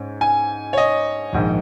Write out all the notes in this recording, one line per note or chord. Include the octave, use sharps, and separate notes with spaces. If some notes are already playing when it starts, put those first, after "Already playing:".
Already playing: G#2 C#4
G#5
C#5
D#5
A#1 G#2 D#3